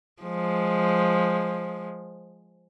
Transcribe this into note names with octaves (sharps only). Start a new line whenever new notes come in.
F3 G#3